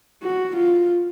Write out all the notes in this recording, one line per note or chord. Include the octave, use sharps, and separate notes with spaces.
F#4
F4